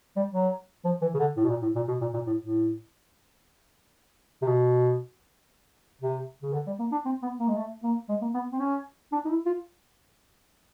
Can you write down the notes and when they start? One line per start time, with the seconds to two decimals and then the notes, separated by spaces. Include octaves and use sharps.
0.16 G3
0.33 F#3
0.85 F3
1.02 E3
1.14 C#3
1.19 D3
1.37 A2
1.45 B2
1.49 A#2
1.62 A2
1.75 A#2
1.88 B2
2.01 A#2
2.13 A#2
2.27 A2
2.40 A2
4.42 C3
4.47 B2
6.01 C3
6.42 C#3
6.53 D3
6.67 G3
6.79 A#3
6.92 D4
7.05 C4
7.22 B3
7.40 A#3
7.48 G#3
7.56 A3
7.83 A#3
8.09 G#3
8.21 A#3
8.34 B3
8.52 C4
8.60 C#4
9.12 D4
9.25 D#4
9.29 E4
9.46 F4